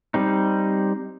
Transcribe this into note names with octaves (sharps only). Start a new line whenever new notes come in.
G3 C4 D#4